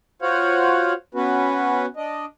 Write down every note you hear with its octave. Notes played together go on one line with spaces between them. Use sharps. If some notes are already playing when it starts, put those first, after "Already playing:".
F4 F#4 C5 C#5 F5 F#5
B3 C#4 F#4 B4
D4 D#5